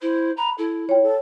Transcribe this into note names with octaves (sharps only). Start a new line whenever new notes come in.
E4 C5
A#5 B5
E4 A4
F4 C#5 G5
A4